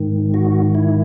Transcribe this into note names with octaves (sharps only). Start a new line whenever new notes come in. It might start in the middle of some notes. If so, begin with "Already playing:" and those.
Already playing: G#2 D#3
F#4
E4